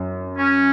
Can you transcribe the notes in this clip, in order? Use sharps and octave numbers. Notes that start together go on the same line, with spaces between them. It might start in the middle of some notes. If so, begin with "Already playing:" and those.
Already playing: F#2
C#4